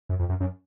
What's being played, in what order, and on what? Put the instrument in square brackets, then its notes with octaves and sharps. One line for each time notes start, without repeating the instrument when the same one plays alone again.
[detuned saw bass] F#2
F2
F#2
F#2